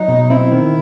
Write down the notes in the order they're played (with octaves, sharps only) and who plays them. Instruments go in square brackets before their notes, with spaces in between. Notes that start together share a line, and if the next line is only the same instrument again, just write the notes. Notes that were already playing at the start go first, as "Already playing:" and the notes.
Already playing: [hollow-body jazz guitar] F#3 [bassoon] D#4
[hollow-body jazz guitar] B2
[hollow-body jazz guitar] C4 [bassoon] E4
[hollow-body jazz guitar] D#3